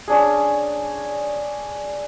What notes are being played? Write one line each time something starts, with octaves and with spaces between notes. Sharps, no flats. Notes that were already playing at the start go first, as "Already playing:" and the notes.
C#4 D4 G#4